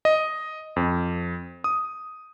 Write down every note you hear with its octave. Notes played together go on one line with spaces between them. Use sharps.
D#5
F2
D#6